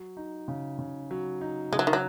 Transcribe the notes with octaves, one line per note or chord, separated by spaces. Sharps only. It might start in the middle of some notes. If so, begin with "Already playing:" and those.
Already playing: F#3
D#4
C#3
C#3
F#3
D#4
C#3 G#3
F#3
D#3
F#3